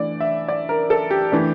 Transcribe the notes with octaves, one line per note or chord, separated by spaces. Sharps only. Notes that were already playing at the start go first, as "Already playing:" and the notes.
Already playing: E3 A3 D4 D5
E5
D5
A#4
A4
G4
E3 A3 D4